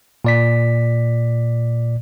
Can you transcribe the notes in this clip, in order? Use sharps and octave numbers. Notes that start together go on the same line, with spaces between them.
A#2 D5 B6